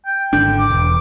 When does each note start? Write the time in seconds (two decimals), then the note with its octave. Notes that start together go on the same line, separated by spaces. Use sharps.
0.06 G5
0.33 G#1 D3 D4 G5
0.59 D6
0.70 E1